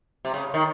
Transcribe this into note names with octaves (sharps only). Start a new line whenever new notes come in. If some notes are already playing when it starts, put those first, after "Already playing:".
C3
C#3
D#3